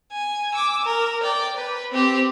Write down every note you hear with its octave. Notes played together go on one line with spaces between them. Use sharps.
G#5
D6 E6
A#4
D5 G5
B4
C4 G4